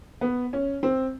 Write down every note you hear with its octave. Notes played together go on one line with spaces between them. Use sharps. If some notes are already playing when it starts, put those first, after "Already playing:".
B3
C#4
C4